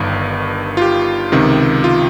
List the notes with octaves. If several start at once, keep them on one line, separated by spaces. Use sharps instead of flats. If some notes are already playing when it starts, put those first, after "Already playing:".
Already playing: G1 G2 D#3
F4
G4
C#2 C3 D#3
F4